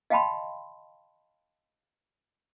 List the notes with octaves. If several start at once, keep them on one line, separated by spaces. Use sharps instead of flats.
D#5 F5 G5 A5 B5 C6